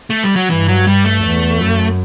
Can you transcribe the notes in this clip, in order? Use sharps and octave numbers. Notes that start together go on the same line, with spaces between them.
A3
G3
F#3
G2 E3
F#3
G3
A3
E2
F#2